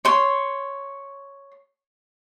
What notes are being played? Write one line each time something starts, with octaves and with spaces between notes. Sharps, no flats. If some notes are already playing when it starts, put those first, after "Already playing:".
C#5 C6